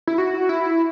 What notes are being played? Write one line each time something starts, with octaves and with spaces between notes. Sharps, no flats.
E4
F#4
E4